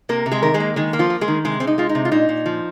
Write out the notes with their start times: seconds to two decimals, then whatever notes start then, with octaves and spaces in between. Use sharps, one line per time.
0.09 C3 A#3 A#4
0.26 C3
0.32 G#3 G#4
0.42 D#3 A#4
0.54 G#3 G#4
0.60 A#3
0.76 D#3 G#3 G#4
0.93 A#3
0.99 F3 F4
1.10 A#3
1.21 G#3 G#4
1.28 D#3
1.45 C3 G#3 G#4
1.60 G#3 C4
1.67 D#4
1.78 G#3 F4
1.89 D#4
1.95 C3
2.05 F4
2.12 A#2 D#4
2.29 A#2
2.46 F3